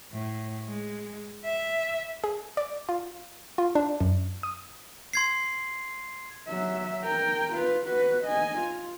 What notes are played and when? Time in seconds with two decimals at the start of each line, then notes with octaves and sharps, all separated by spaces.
0.12 A2
0.65 G#3
1.45 E5
2.24 G#4
2.57 D5
2.89 F4
3.58 F4
3.75 D4
4.00 F#2
4.43 D#6
5.13 C6 G#6 C7
6.47 F#3 E5
7.03 A#4 G5
7.53 F4 B4
7.85 F#4 B4
8.24 D#5 G#5
8.59 F4